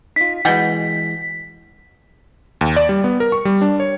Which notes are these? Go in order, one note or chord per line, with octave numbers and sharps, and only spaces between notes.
D#4 F4 B6
B2 E3 G#3 F#5 G5
D#2
D5
G3
B3
A#4
C#6
G3
D4
C#5